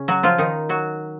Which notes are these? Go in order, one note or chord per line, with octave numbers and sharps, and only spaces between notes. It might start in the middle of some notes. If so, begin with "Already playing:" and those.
Already playing: C#3 C#4
F#3 F#4
F3 F4
D#3 D#4
F#3 F#4